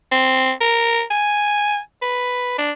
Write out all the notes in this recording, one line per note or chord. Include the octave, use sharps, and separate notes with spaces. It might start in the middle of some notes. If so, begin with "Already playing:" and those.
C4
A#4
G#5
B4
D4